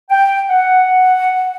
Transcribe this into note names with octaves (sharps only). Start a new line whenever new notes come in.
G5
F#5